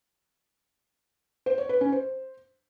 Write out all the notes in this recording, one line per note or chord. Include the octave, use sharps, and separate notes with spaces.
C5
C#5
B4
C#4
C5